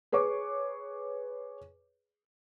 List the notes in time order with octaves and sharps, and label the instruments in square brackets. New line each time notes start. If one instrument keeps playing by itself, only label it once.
[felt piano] G#4 B4 C#5 C#6 D6